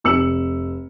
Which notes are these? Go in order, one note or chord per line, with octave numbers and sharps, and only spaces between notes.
F1 E6 C#7 F#7